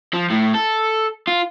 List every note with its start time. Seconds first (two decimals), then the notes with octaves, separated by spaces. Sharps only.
0.14 F3
0.30 A2
0.55 A4
1.28 F4